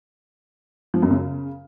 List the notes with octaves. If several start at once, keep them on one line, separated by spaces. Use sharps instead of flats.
F3
F#2
C#3